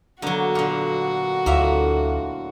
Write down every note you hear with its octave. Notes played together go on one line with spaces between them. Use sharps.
D3 F#3 A#3 B3 F#4 C#6
A#2 D3
D2 A2 D3 A#3 F4 E5